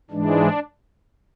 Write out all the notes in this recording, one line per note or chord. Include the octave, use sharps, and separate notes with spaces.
G#2 E3 G#3 D4